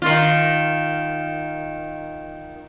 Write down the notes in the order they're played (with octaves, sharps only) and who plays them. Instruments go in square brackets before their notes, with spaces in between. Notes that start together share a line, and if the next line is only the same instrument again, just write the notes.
[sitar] D#3 F4